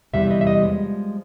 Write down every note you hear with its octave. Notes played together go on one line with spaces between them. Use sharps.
E2 C3 E3 G3 E5
D#5
E5
D#5
F3 G#3